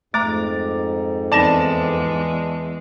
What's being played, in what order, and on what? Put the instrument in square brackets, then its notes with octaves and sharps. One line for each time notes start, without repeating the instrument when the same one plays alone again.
[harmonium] F2 G#2 [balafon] A3 [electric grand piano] A#5 D6 A6
[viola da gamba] E2 G#3 [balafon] C4 D#4 [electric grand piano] D5 A5 E7